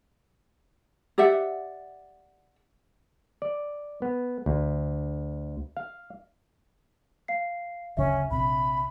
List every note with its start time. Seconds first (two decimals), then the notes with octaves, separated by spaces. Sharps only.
1.18 G4 D5 E5 F#5
3.42 D5
4.02 B3
4.46 D2
5.77 F5
7.28 F5 C7
7.97 F#1 D2 C#3 C#4 E5
8.30 A#1 C3 B5